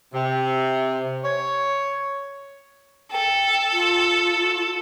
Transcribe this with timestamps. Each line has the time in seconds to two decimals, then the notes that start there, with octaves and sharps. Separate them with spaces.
0.13 C3
1.24 C#5
3.12 A4 G5
3.72 F4